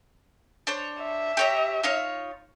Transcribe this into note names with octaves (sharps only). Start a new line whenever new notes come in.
D4 C5 C#5
E5
G4 C#5 A#5
D#4 F4 C#5